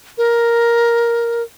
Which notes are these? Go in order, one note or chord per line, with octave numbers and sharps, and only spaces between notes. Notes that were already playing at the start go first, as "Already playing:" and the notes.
A#4